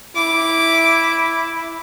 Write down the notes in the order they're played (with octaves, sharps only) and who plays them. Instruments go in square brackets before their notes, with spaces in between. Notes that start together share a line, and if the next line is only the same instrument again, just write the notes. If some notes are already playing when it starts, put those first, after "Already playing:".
[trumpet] E4 [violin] D6